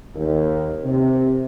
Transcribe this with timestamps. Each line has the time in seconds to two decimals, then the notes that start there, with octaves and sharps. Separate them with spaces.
0.15 D#2
0.84 C3